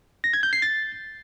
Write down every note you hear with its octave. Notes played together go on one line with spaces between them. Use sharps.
A#6
G#6
G6
C7
A6